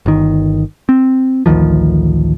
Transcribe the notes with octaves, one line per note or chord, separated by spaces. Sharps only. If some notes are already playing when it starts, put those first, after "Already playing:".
G1 D#3
C4
A1 D2 D#3 F3